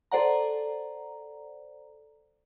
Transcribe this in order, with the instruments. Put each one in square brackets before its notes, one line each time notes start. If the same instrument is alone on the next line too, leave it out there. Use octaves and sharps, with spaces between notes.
[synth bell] A4 C5 D5 F#5 A#5